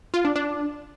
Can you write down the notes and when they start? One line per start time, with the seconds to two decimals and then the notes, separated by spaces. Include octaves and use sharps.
0.14 F4
0.25 D4
0.36 D4